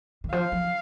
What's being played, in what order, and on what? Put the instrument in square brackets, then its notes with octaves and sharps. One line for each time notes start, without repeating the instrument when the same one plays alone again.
[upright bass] D#3
[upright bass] F3 [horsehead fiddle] F5
[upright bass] F3